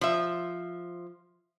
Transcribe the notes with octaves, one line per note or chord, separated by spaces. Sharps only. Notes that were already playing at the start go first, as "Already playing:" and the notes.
F3 E5